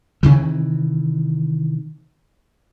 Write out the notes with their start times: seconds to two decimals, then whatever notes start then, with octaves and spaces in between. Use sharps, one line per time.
0.23 C3 D#3 E3